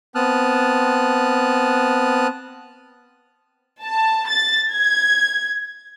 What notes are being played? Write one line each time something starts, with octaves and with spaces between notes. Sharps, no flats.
B3 C4 A5 D#6 F6 F#6
A5
A6
G#6